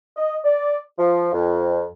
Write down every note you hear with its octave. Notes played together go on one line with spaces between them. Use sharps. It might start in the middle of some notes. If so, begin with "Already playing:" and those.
D#5
D5
F3
F2